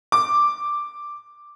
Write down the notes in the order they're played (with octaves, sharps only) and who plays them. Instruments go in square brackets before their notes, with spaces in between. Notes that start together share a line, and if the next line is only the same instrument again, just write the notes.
[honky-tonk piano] D6